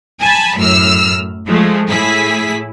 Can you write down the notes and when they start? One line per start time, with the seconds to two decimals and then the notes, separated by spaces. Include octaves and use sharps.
0.20 G#5 A5 B5
0.57 F#2 A2 E6 F6
1.46 F3 G#3 A3
1.88 A2 E4 G#4 B6